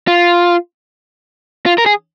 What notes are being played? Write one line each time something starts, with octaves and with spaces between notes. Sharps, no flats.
F4
F4
A#4
G#4